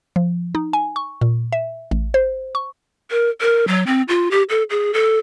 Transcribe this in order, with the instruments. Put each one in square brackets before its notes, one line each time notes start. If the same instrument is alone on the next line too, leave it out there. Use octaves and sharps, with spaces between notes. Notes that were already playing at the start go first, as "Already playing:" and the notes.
[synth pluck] F3
D#4
G#5
C#6
A#2
E5
A1
C5
C#6
[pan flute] A#4
A#4
F#3
C4
F4
G4
A4
G#4
A4